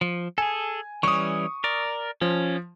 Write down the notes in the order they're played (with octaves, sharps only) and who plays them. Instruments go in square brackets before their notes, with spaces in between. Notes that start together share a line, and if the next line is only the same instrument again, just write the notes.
[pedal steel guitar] F3
[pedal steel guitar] G#4 A4 [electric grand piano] G#5
[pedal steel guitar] E3 G3 C#4 [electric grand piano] C#6 D#6
[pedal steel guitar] A#4 D5
[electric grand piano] F3 [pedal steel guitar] C#4